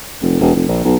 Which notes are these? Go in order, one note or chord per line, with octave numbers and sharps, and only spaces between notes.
F1
E1
F1
A#1
B1